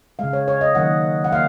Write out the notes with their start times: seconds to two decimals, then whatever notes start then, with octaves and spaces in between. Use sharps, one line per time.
0.19 C#3 G#3 F5
0.33 C#5
0.48 C#5
0.61 D#5
0.75 D#3 F#3 A#3 F#5
1.24 F#5
1.32 A#3 F5